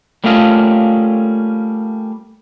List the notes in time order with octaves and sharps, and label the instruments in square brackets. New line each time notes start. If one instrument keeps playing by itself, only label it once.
[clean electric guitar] G3 A3 A#3 C#4 F4 D#5